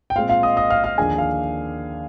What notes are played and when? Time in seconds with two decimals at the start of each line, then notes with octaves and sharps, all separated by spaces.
0.10 G5
0.16 A#2 G#3 C4 F4 F5
0.29 F4 F5
0.43 D#5 D#6
0.57 D#5 D#6
0.70 F5 F6
0.84 F5 F6
0.98 D#2 D3 F3 A#3 D4 G#4 G#5
1.18 F5 F6